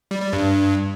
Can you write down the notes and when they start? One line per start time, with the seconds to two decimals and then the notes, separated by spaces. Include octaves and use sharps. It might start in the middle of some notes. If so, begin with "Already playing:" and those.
0.11 G3
0.22 G3
0.33 G2